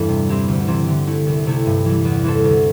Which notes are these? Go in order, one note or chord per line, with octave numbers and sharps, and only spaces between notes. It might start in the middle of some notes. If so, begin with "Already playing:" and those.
Already playing: E2 G2 E3 G3 A3 D4 E4 A4
C3
E3 C4 E4 G4
D2
C3 E3 C4
D3
A3 E4
C2
C3 A3 E4
G2
E3 G3
E2
E3 C4 A4
D2